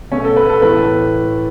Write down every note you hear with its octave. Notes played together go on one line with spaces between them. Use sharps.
B2 A3 C#4
A4
B4
A4
A2 E3 A3 B4